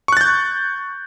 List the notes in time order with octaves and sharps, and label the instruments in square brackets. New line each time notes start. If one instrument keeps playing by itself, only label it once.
[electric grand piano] C#6
F#6
A6
G6